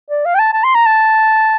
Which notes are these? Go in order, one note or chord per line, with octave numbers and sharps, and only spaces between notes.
D5
F5
G5
A5
A5
C6
A#5
A5